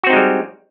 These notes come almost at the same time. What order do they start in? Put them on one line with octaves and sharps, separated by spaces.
F#4 C4 D#4 G#3 G3